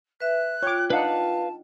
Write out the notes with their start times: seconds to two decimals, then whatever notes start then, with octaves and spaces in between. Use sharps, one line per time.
0.20 B4 E5 F#6
0.63 F4 C#5 G5 D6
0.90 D4 D#4 B4 F5 F#5 A5